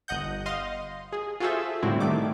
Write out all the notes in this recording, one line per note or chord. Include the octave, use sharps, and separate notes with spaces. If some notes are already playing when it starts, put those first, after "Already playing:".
G1 D#5 F#5 G6
D#5 F5 C6
G#4
F4 F#4 G#4 A4 C5 E5
A2 D3 G3 C4 E4 F#4
D#3 A3 D6